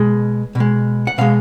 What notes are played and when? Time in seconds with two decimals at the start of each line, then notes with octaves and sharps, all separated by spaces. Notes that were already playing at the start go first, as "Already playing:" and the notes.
Already playing: B2 G#3
0.55 B2
0.60 G#3
1.07 F#5
1.18 B2 G#3 F5